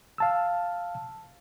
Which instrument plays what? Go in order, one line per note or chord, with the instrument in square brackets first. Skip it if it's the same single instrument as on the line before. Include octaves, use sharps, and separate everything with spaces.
[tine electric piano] F5 A5 E6